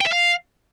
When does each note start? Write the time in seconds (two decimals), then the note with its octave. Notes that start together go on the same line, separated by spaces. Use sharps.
0.01 G5
0.07 E5
0.13 F5